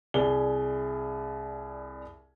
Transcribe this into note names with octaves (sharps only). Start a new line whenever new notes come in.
C2 G#4 D5 G7